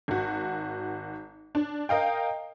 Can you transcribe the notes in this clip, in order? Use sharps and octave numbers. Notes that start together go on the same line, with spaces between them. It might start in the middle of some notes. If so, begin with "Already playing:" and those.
G#1 F#4
D4
A#4 D#5 F5 G5